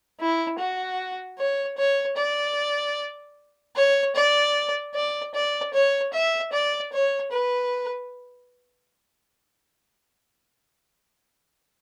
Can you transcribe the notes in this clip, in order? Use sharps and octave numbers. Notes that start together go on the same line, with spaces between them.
E4
F#4
C#5
C#5
D5
C#5
D5
D5
D5
C#5
E5
D5
C#5
B4